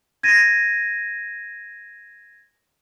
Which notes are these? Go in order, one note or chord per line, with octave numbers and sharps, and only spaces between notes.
G#6 A#6 D#7